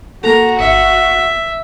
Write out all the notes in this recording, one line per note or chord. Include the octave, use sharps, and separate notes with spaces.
A#3 F#4 A4 A#5
G1 E5 C#7